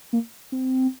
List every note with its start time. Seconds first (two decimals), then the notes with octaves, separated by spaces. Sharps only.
0.13 A#3
0.52 C4